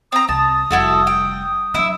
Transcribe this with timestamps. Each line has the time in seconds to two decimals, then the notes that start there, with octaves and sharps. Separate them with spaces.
0.12 C4 A#5 D#6
0.29 C2 A5 D#6
0.71 F1 G3 E4 F#4 A4
1.07 G5
1.74 F#3 D4 E4 E5